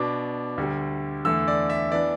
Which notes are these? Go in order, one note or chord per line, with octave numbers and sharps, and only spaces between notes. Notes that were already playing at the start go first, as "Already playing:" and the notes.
Already playing: B2 B3 D4 D6
D2 D3 G3
E2 D3 A3 E6
D5
E5
E3 B3 D4 D5